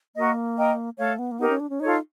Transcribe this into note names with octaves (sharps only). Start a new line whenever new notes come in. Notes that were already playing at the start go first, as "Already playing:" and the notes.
A#3 F#4 A#4 D#5
A#4 D#5 G5
A3 A4 C#5 F5
B3
A#3
B3 D#4 G4 A#4
C#4
D4
C#4
D#4 F4 A4 C#5